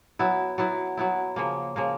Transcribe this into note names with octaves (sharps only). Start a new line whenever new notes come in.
F#3 B3 E4
F#3 B3 E4
F#3 B3 E4
C#3 F3 A#3
C#3 F3 A#3